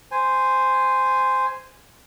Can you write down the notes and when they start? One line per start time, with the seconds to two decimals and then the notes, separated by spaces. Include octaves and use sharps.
0.11 C5 G#5